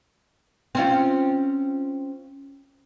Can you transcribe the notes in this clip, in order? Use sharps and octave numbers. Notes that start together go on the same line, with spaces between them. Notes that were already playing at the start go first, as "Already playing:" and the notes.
C4 C#4 F4